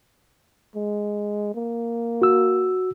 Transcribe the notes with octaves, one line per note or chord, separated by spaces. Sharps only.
G#3
A#3
F#4 E6